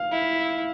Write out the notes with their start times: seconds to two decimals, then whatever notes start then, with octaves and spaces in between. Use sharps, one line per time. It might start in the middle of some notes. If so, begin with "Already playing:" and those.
Already playing: F5
0.11 E4